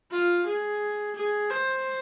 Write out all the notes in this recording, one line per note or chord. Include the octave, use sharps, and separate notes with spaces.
F4
G#4
G#4
C5